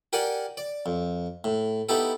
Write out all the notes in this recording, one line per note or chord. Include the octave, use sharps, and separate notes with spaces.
G4 A#4 D5 F#5 G#5
D5
F2
A2
B3 D#4 E4 G4 A4